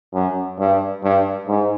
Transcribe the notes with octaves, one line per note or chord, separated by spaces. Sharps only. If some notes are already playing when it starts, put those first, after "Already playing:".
F#2
G2
G2
G#2